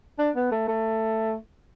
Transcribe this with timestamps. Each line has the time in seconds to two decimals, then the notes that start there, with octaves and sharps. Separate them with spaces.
0.19 D4
0.36 B3
0.52 A3
0.68 A3